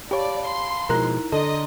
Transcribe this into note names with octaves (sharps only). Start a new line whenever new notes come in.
G4 C#5 D5 F5 A5 B5
C6
B2 F3 G#3 D#4 E4 A#4 A#5 F#6
D3 D4 A4 D#5 A#5 C6